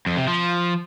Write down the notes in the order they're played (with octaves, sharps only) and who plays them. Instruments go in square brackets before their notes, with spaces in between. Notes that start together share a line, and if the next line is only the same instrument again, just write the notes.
[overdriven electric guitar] F2
C3
F3